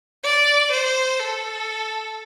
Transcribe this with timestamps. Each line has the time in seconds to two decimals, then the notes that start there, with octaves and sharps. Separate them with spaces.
0.23 D5
0.72 C5
1.20 A4